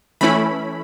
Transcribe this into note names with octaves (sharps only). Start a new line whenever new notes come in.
E3 A3 C#4 E4 B5